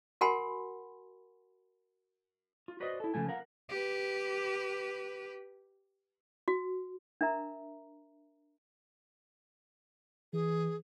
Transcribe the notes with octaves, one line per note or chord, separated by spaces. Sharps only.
F#4 A#4 F#5 G#5 B5 C6
F4
F#4 B4 C5 D5 D#5
E4 A4
C#3 F3 A3 G#5
A#4 F5 F#5
G4 B4
F#4
D4 A#4 E5 A#5
E3 G#4